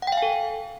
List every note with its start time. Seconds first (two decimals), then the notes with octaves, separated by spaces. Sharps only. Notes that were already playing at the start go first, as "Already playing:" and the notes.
0.02 F#5
0.07 G5
0.12 F5
0.17 G#5
0.22 A4